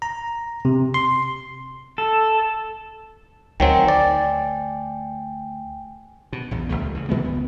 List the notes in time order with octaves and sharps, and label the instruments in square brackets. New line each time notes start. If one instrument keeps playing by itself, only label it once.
[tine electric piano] A#5
C3
C6
[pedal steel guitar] A4
[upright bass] D2 [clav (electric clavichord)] D#3 F#3 C4 [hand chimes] G5 G#5
[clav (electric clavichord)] D5
[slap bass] B2
A#1 E2
D#1 G#1 C#2 A3
C#3 E3
A#2 D#3 G#3 B3
D#1 C#2 B3